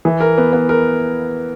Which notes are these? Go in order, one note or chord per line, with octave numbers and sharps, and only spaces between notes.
E3
A#4
B3
B3
A#4